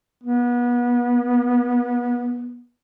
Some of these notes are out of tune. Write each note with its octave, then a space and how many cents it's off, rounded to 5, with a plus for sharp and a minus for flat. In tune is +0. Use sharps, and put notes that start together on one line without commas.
B3 -30